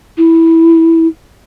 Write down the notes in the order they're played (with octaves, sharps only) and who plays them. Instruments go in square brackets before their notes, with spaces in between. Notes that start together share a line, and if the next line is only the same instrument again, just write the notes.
[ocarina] E4